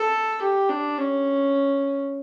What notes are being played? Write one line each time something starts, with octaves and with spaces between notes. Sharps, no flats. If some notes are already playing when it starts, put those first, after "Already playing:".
Already playing: A4
G4
D4
C#4